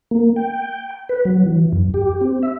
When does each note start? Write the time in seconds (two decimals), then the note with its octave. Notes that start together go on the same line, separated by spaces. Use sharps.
0.11 A#3
0.36 G5
1.09 B4
1.25 F#3
1.45 E3
1.73 F#2
1.94 G4
2.21 C4
2.43 E5